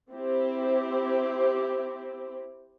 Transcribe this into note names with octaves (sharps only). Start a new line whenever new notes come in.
C4 E4 G4